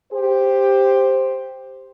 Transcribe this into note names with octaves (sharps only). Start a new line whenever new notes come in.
G4 C5